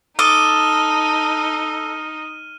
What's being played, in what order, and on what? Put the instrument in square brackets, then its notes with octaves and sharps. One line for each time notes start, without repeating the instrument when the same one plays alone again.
[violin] D#4 [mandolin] A4 D6 [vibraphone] D#6 [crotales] F6 D#7 G7